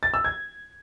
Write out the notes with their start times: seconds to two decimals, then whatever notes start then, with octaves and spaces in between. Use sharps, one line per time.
0.03 A6
0.14 E6
0.25 G#6